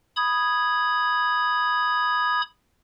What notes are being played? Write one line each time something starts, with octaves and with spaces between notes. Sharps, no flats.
B5 D#6 G#6